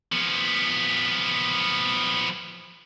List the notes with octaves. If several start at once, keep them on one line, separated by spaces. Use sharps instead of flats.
F3 B3